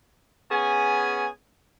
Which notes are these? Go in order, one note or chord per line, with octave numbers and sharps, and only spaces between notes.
B3 C#4 G#4 G#5